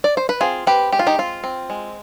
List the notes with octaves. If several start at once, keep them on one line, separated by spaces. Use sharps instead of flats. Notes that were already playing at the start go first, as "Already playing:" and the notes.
D5
C5
B4
C4 F4 G#4
C4 G4 B4
G#3 G4
F4
D#4 G4
C4 F4
C4
G#3